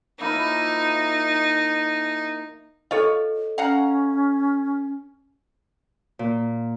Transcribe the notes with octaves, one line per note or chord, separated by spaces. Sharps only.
F3 A#3 D#4 E4
F4 A4 C#5 D#5
C#4 F5 F#5 A#5
A#2